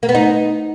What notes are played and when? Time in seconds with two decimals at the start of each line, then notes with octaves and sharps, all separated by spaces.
0.03 A#3
0.09 B3
0.15 D#4